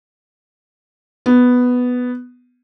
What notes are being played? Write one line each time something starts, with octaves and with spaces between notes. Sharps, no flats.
B3